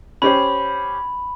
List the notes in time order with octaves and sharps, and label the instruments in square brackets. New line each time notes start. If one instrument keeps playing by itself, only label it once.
[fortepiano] C#4 G4 C5 [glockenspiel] B5